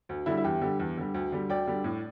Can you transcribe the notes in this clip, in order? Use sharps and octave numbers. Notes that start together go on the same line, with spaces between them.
D2
D3 G3 E4
E4
E2 G4
D3 G3
E2
D3 G3
D2
D3 G3
D2 D5 G5
D3 G3
A2